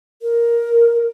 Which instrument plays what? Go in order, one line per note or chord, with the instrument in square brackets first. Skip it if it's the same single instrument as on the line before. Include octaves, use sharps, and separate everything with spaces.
[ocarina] A#4